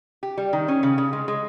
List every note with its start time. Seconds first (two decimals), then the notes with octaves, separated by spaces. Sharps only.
0.23 G4
0.37 G3
0.53 D#3
0.68 C#4
0.83 C#3
0.98 C#3
1.13 G#3
1.28 G#3